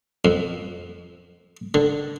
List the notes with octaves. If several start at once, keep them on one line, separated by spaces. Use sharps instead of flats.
F2
D3